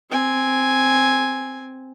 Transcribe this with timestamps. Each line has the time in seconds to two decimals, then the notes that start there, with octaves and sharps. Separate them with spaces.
0.10 C4 G#5